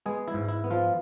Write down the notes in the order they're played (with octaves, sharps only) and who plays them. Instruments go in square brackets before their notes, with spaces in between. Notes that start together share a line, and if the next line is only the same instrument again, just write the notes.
[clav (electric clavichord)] G#3 B3 G#4
E4
G#2
E4
B3
F3 F4